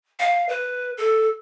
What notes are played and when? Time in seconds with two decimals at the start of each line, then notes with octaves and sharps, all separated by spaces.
0.19 F5
0.49 B4
0.98 A4